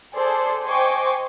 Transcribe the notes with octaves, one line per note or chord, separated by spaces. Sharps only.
G#4 A4 C5 D5
C5 D#5 G5 G#5 C#6 D6